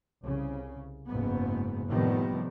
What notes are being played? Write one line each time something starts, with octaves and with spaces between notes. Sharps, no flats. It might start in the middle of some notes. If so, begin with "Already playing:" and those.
C2 C#3
F#1 G#2 B3
A2 C3 D#3 F3 G3 B3